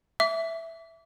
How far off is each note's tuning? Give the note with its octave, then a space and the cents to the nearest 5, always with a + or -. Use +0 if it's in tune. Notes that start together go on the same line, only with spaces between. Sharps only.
E5 +0 D6 -35